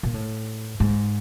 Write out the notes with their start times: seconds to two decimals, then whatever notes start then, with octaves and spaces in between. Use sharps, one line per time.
0.03 A#2
0.14 A2
0.80 G#2